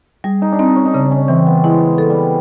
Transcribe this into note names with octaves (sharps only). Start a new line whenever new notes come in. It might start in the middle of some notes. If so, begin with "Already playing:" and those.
G3 G#4
D#4
D4
C4 D#4
C#4
D#4
C#3 D4
C#4
E3 C4
B3
G#3 E4
A4
G3